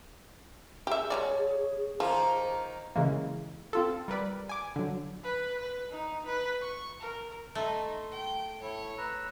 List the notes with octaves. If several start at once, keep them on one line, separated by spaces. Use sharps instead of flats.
G4 G#4 E5
F#3 G#3 C#5 D5
D#3 F3 A#3 D#4 C5
C#3 E3 G#3 A#3
C4 F4 A4
G3 A#4 B4 D5
G#5 D6
D3 F#3
B4
B4
D#4
B4
C#6
A#4
A3 D#4 C6
G5
E4 A4 C#5
B4 A#5 E6